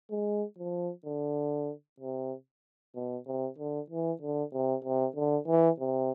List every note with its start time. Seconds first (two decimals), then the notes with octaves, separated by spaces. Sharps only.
0.11 G#3
0.58 F3
1.05 D3
2.00 C3
2.95 B2
3.27 C3
3.58 D3
3.90 E3
4.21 D3
4.53 C3
4.85 C3
5.16 D3
5.48 E3
5.79 C3